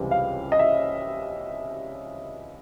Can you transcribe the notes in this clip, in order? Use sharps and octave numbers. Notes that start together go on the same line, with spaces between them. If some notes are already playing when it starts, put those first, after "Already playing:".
Already playing: C#2 C3 E3 G3 C4
F5
D#5
E5